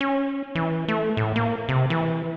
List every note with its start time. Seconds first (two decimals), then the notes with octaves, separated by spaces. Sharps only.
0.01 C#4
0.55 E3
0.88 A3
1.17 A2
1.36 A#3
1.69 C3
1.90 E3